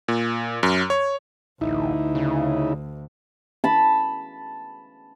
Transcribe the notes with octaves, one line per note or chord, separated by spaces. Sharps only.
A#2
F#2
C#5
A1 D2 D#4 E4
C#3
A5 B5